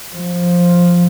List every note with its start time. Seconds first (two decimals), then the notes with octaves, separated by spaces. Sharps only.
0.15 F3